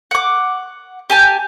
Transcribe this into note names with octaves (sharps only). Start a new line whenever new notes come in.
F#5 D6
G4 G#5 A5